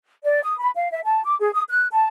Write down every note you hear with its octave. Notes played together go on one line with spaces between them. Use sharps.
D5
D#6
B5
F5
E5
A5
D6
G#4
D#6
F#6
A5